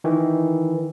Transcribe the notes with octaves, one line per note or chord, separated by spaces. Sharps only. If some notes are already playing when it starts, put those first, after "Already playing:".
D#3 E3